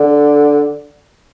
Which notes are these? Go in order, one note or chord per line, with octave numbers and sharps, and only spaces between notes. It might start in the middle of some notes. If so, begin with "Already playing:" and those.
Already playing: D3